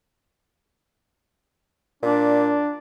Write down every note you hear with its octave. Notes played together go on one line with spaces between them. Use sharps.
A#2 D4